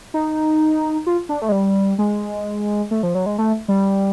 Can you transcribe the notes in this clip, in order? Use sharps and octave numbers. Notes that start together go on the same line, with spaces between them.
D#4
F4
D4
A3
G#3
G3
G#3
A3
F3
F#3
G#3
A3
G3